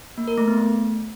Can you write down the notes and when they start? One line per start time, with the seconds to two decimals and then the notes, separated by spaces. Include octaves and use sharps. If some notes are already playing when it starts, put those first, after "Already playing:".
0.18 A#3
0.28 A#4
0.38 A3
0.48 B3
0.58 A3